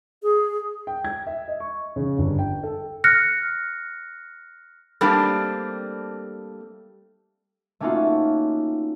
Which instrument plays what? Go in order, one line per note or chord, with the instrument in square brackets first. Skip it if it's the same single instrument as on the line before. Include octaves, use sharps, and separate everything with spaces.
[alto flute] G#4
[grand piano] G5
G#6
E5
D#5
C#6
C#3
G1
G5
A4
[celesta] F6 F#6 A#6 C#7
[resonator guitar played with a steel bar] G3 A3 A#3 C4 D4 G4
[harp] A3 A#3 C#4 D#4 F4 F#4